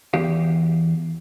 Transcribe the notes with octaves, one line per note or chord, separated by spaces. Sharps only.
E2 G4 F5